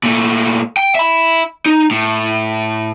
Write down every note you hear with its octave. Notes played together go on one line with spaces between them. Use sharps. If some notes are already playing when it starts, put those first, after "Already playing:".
A#2 A3
G5
E5 B5
D#4
A2